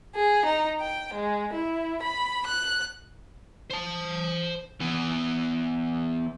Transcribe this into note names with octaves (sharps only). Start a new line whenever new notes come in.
G#4
D#4
G5
G#3
E4
B5
F#6
C5 A5
E3 B3